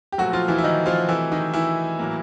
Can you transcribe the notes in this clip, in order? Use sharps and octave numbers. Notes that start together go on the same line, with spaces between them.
G4
A#2 F3 F#3 A3 F#4
F3 F4
E3 E4
E4
D#3 D#4
F3 F4
C3 D#3 E3 F#3 A3 E4
D#3 D#4
E3 E4
A2 F#3 A#3